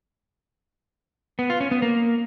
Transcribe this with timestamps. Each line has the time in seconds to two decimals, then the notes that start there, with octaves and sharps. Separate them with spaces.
1.39 B3
1.50 F4
1.61 C#4
1.71 B3
1.82 A#3